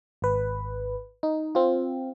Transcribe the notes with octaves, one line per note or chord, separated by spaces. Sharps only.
G#1 B4
D#4
C4 F4